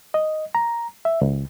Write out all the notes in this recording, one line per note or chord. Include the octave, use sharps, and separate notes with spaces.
D#5
A#5
E5
C#2